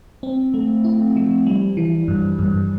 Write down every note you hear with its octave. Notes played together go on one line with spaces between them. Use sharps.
C4
A3
E4
F3
G3
E3
G2
G2